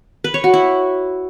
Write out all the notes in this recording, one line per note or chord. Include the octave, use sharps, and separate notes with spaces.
B4
C#5
F#4
E4